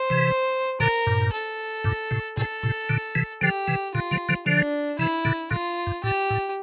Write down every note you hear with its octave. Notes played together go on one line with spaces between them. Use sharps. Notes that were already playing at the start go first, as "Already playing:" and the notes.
Already playing: C5
C3 E3
A#2 D3 A#4
G2 A#2
A4
G2 A#2
A2 C3
A2 C3 A4
A2 C3
A#2 D3
C3 E3
D3 F3 G4
C3 E3
A#2 D3 F4
D3 F3
D3 F3
D3 F3 D4
C3 E3 E4
A#2 D3
A#2 D3 F4
G2
A2 G4
A2